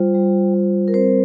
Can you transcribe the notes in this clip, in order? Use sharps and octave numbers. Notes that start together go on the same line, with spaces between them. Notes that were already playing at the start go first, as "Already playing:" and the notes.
Already playing: G3 F4 C5
G3
G3
A#4
C4 C5